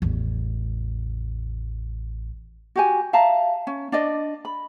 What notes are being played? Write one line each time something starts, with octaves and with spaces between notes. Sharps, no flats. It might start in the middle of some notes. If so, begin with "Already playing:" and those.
A1 E2
F#4 G4 G#5
E5 F5 A5 A#5
C#4
D4 D5 D#5
B5